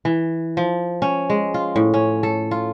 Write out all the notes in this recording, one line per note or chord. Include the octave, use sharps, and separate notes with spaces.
E3
F3
C#4
G#3
F4
A2
C#4
A4
F4